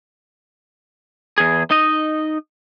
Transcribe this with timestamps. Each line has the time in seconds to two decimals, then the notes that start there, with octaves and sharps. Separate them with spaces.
1.38 E2 G#4
1.71 D#4 D#5